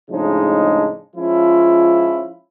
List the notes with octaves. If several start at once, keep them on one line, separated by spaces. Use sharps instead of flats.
A2 C#3 F3 G#3 D4 D#4
F3 G#3 C#4 E4 F4